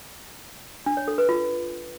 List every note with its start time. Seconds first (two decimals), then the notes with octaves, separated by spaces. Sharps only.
0.86 D4
0.97 C#5
1.08 A4
1.18 B4
1.29 F4